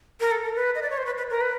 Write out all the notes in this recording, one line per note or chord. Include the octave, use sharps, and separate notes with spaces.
A#4
A4
A#4
B4
D#5
D5
C#5
C5
B4
B4
A#4
B4